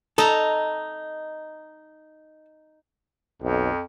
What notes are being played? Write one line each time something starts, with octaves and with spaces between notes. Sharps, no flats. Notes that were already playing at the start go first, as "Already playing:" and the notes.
D#4 A4 A#5
B1 F2